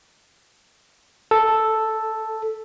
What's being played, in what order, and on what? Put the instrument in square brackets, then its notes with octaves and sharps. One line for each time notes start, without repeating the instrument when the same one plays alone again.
[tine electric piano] A4